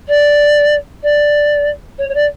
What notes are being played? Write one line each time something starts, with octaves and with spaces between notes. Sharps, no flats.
D5
D5
C#5
C#5
D5